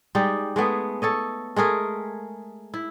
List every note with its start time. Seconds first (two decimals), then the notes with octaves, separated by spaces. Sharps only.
0.15 G3 G#3 D#4 G4
0.56 G#3 A3 B3 G#4
1.02 A4 C#5 D#5
1.56 G#3 A3 G#4 A#4
2.74 E4